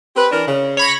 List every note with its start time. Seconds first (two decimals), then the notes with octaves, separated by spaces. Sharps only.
0.16 C4 G4 B4
0.32 E3 D4 A#4
0.47 C#3
0.77 C#5 B5 A#6